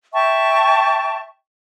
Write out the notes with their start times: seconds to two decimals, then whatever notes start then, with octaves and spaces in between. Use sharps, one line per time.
0.13 E5 G5 A5 C#6